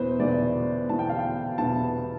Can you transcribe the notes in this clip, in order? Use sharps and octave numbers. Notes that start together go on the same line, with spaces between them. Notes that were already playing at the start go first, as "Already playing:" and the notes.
Already playing: E2 B2 B3 E4 B4 C5
E2 B2 B3 E4 D5
E2 B2 B3 E4 A5
G5
F5
G5
E2 B2 B3 E4 A5